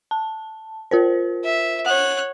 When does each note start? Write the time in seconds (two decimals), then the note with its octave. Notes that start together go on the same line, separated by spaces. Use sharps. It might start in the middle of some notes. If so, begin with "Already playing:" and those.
0.11 A5
0.91 F4 A#4 C5
1.44 E5
1.86 C#5 F#5 F#6